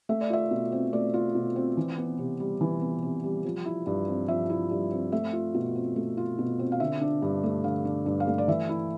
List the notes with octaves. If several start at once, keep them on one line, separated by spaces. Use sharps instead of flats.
A3 E5
D5
F4 E5
B2
C4
A3 D5
F4
B2
C4
E3
B3
C3
G3
E3
B3
C3
G3
F3
E4
G2
C4
F3 E5
E4
G2
C4
A3 E5
F4
B2
C4
A3
F4
B2
C4
F5
D3 E5
D4
G2
A3
D3 F5
D4
G2
F5
A3
D5
E3 E5
E4